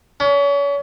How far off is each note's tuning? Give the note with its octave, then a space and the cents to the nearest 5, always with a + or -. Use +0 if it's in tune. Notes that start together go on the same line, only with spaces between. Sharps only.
C#4 +35